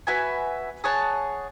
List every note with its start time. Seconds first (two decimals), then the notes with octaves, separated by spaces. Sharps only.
0.07 F#4 B4 E5 G#5
0.84 G#4 C#5 F#5 A5